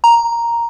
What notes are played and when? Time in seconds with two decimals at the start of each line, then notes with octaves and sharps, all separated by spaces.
0.04 A#5